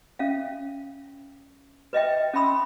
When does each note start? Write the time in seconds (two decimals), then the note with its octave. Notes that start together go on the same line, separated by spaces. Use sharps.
0.19 C#4 E5 F5
1.93 B4 D#5 E5 G5
2.34 C#4 E5 G5 B5 C6 E6